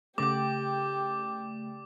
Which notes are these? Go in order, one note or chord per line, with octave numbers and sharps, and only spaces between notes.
C#3 A3 G4 D5 G5 D6